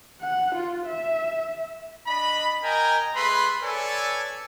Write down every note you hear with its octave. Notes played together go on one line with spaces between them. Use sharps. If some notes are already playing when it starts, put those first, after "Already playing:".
F#5
F4
E5
D4 D#5 B5
A#4 D#5 G5 G#5 A#5
A3 G#4 B4 B5 C6
A4 B4 C#5 D5 G#5